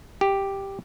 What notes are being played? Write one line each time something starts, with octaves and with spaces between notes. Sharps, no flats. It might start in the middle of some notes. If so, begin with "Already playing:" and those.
G4